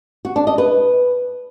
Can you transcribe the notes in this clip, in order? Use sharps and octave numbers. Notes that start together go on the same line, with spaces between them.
F#4
D4
D#5
B4